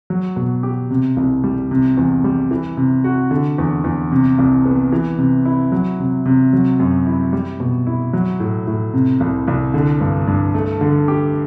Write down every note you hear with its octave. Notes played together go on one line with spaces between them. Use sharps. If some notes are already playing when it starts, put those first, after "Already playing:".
F#3
B2
G4
C3
C2
G3
C3
E2
G3
E3
C3
F#4
D3
E2
E2
C3
C2
B3
E3
C3
E4
F#3
C3
C3
F#3
F#2
E4
G3
B2
E4
F#3
A2
A2
C3
C2
C2
D3
G2
G2
A3
D3
G4